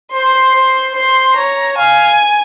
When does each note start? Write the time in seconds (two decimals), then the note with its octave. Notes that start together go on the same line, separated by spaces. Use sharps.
0.13 C5 C6
0.54 C5
0.95 C5 C6
1.36 C#5 A#5
1.76 F5 G#5